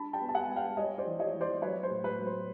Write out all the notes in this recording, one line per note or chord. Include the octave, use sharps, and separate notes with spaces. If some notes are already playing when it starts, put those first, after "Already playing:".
Already playing: D4 A5 B5
G5 A5
B3
A5
F#5 G#5
B3
F5 G5
G3 C#5 D#5
C5 D5
E3
C#5 D#5
E3
C5 D5
F#3 B4 C#5
C5
A2
B4
F#3
C5